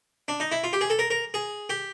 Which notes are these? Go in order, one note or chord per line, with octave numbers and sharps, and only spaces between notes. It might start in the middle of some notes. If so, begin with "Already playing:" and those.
D4
D#4
E4
F4
G4
G#4
A4
A#4
A#4
G#4
G4